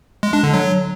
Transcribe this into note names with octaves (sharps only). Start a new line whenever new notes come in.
G#3
D4
D3
F#3